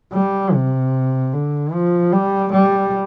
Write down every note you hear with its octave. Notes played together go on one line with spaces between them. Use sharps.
G3
C3
D3
F3
G3
G3